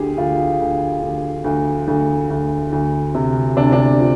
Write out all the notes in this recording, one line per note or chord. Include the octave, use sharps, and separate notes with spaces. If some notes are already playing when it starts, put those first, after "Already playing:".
Already playing: D2 D3 G4 G#4
D2 F4
D2
D2
D2
D2
D2
D2
C3
C3 D4
D4
F3